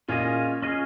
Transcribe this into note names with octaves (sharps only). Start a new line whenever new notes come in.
A#2 C#4 F4 G#4 D#5
C#4 F4 G#4 D#5